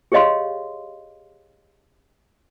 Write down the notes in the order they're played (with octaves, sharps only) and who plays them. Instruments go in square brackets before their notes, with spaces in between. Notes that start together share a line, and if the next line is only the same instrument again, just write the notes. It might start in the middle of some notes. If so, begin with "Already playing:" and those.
[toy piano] G4 G#4 C#5 D#5 F5 C6